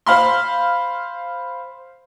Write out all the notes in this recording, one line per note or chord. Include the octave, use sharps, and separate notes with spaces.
C5 F5 B5 C6